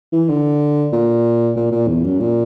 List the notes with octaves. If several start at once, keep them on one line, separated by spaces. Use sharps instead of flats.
E3
D3
A#2
A#2
A#2
E2
F#2
A#2